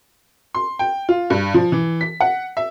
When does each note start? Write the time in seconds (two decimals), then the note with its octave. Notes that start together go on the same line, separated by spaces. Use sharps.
0.54 C6
0.79 G5
1.09 F4
1.30 G2
1.54 F3
1.72 E3
2.01 B6
2.20 F#5
2.57 E5